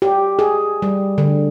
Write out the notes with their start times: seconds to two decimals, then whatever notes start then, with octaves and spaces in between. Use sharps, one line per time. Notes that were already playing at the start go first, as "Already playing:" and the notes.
0.02 G4
0.39 G#4
0.82 G3
1.18 D3